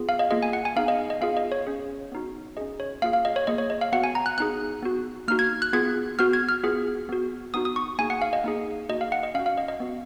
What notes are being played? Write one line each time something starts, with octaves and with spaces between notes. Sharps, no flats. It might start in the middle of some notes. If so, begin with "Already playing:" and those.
Already playing: B3 F4 G#4
F5
D#5
A#3 F4 G#4 D#5
G#5
F#5
G#5
B3 D#4 G#4 F5
D#5
D#5
B3 F4 G#4 F5
D#5
C#5
C#4 G#4
B3 D#4 F#4
C#4 G#4 D#5
C#5
A#3 F4 G#4 F5
F5
D#5
C#5
A#3 F4 G#4 D#5
C#5
D#5
F5
B3 F#4 F#5
G#5
A#5
F#6
B3 D#4 G#4 F#6
B3 F#4
A#3 D#4 F#4 F6
G#6
F#6
B3 F4 G#4 G#6
B3 F#4 F6
G#6
F6
B3 F4 G#4
B3 F#4
B3 D#4 F#4 D#6
D#6
C#6
A#3 D#4 G#4 G#5
F#5
F5
D#5
A#3 D#4 G#4
A#3 D#4 F#4 D#5
F5
F#5
D#5
C#4 F#4 F5
F5
D#5
D#5
B3 F#4